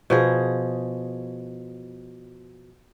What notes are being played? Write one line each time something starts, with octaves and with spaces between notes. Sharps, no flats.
B2 F3 G#4